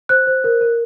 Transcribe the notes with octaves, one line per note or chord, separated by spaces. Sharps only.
C5 F#6
C5
A#4
A#4